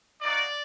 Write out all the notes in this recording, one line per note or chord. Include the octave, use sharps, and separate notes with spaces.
A#3 D#4 F#4 D5